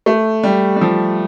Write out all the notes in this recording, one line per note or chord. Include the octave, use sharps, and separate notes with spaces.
A3
G3
G3
F3